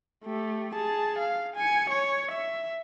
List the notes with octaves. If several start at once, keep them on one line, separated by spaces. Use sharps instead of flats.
A3 G4
G#4 A5
F5
G#5 C#7
C#5
E5